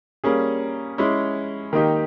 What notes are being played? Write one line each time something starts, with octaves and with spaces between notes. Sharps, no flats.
G3 A#3 C#4 G#4
G#3 C#4 E4
D#3 A#3 D#4 G4